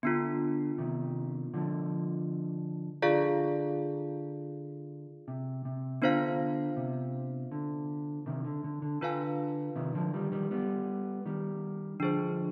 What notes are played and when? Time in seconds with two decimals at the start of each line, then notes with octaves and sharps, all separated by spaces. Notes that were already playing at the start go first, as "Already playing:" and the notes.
0.03 D3 B3 D4 F4
0.78 C3 D#3
1.54 D3 F3
3.02 D3 F4 G#4 D5 F5
5.28 C3
5.65 C3
6.02 D3 B3 D4 F4 C5 F5
6.77 C3
7.52 D3
8.26 C3 D#3
8.45 D3
8.64 D3
8.82 D3
9.01 D3 D4 F4 B4 F5 G#5
9.76 C3 D#3
9.94 D3 F3
10.14 D#3 G3
10.32 D#3 G3
10.51 G3 B3
11.26 D#3 G3
12.00 D3 F3 D4 G#4 C5